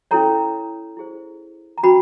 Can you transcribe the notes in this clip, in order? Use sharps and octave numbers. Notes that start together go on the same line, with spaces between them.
C#4 E4 A4 C#5 A#5
E4 G#4 C5
A#5
C#4 F#4 B4 B5